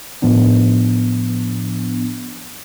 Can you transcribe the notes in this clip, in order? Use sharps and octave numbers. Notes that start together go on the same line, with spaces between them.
A2 F3 B3 D4